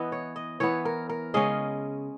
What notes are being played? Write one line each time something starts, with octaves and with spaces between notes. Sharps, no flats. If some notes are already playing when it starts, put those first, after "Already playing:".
Already playing: E3 B3 D#5
C#5
D#5
E3 B3 C#5
A#4
A#4
C#3 G#3 C#4 D#5